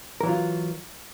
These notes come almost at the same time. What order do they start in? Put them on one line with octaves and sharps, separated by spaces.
A#4 E3 F#3 F4